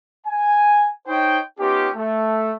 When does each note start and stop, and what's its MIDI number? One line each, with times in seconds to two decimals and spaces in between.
0.26 0.88 80
1.07 1.39 63
1.07 1.39 72
1.07 1.39 73
1.07 1.39 75
1.07 1.39 79
1.59 1.89 59
1.59 1.89 61
1.59 1.89 63
1.59 1.89 65
1.59 1.89 67
1.95 2.53 57